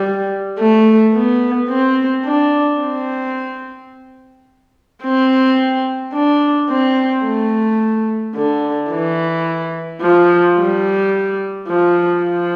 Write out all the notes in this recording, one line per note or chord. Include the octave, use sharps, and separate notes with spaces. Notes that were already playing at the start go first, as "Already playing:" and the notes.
Already playing: G3
A3
B3
C4
D4
C4
C4
D4
C4
A3
D3
E3
F3
G3
F3
F3